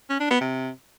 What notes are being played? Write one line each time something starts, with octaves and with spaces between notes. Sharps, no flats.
C#4
D4
B3
C3